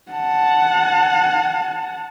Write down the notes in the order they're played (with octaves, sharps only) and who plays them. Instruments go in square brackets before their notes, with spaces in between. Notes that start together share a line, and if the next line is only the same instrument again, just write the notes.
[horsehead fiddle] F#5 A5